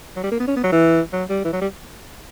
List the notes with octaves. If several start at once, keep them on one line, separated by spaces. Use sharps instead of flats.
F#3
G3
A#3
B3
C#4
B3
F#3
E3
F#3
G3
E3
F#3
G3